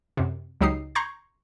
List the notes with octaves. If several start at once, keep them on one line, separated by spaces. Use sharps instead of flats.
F#2 C3
C#2 F#3 D#4 G4 D#6 C7
A#5 C6 C#6 G6 G#6